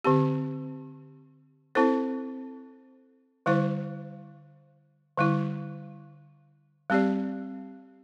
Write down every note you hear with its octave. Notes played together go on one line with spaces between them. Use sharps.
D3 C4 G4
C4 E4 A4 C5
D3 G3 E4 C5
D3 G3 E4
G3 C4 G4 D5